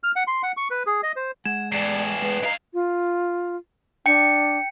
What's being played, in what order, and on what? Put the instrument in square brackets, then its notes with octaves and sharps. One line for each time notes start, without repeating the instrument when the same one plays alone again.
[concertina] F6
F#5
C6
F#5
C#6
B4
G#4
D#5
C5
[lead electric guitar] G#3 [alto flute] F#5 [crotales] G#6 E7
[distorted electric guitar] E2 A2 [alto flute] D5 [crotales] C7 E7
[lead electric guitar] G#3 [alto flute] B4
[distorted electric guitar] G2 F5 [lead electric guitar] D#5 A#5
[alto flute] F4
[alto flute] D4 [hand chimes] G5 C#7